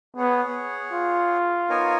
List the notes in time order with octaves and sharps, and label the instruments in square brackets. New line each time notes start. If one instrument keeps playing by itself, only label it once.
[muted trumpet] B3 [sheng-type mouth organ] G#4 C#5 F#5
[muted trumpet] F4
[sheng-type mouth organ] B3 D#4 A#4 C#5 G#5